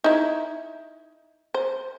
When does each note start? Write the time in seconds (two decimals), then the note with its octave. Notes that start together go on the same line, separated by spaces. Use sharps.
0.04 D#4 E4
1.54 C5